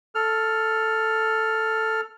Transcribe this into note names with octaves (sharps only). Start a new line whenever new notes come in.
A4 F6